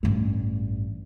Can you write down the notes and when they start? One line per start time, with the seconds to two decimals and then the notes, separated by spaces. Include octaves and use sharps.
0.03 A1 G2